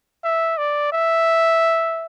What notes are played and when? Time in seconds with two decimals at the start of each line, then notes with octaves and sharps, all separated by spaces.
0.24 E5
0.58 D5
0.92 E5